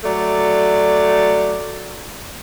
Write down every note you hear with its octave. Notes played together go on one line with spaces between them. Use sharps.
F#3 A3 D5